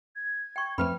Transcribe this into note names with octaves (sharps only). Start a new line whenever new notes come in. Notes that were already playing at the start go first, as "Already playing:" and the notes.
G#6
G5 C#6
F2 F3 A3 B4 G5 B5 F6